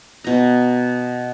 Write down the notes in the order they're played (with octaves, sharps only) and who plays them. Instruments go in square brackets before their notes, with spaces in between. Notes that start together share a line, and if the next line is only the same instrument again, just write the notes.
[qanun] B2 A#5